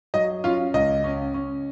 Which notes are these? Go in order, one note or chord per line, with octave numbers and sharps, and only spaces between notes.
F#3 D#5
C#4 F4 F5
C#2 D#5
C#4
C#4